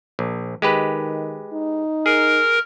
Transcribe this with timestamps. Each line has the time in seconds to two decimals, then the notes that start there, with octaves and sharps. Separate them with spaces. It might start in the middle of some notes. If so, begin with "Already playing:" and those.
0.19 A#1
0.62 D#3 G#3 G4 B4
1.53 D#4
2.06 G#4 A#4